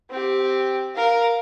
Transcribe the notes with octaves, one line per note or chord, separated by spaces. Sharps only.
C4 G4
A#4 F5